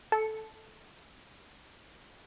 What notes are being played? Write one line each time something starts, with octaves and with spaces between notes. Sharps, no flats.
A4 C#7